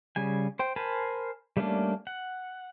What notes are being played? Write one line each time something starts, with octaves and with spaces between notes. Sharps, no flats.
C#3 G3 G#5
C5 G5
A#4 C5 G#5 A5 B5
G3 A3 A#3 C#4 D4
F#5